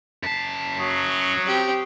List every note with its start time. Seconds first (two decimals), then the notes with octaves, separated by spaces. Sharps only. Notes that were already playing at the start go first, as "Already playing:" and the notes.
0.23 F#2 A5 B6 C7
0.79 F#3 C#6 D#6 C7
1.47 C4 G4